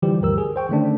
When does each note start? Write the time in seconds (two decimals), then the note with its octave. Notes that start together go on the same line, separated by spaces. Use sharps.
0.02 D3 E3 F3 G3 G4
0.21 D2 G2 A#4 E6
0.38 G#4
0.56 C5 G5 C#6
0.69 D3 D#3 A3 C#4 D4